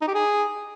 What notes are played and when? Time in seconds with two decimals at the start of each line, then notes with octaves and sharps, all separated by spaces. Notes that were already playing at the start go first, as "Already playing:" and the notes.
0.01 D#4
0.08 G4
0.14 G#4